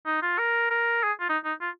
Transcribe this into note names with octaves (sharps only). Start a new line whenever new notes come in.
D#4
F4
A#4
A#4
G#4
F4
D#4
D#4
F4